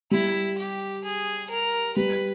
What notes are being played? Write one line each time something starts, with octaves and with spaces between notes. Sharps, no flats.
G3 E4
G4
G#4
A#4
G3 B4